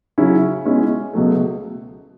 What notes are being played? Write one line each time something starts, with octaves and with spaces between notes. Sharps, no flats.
C#3 F#3 C#4 E4
B2 G#3 C#4 E4
C#2 B2 F#3 A3